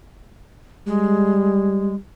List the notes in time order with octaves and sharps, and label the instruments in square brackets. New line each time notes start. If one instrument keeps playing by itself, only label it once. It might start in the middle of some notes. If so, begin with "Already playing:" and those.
[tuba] G3 [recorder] G#3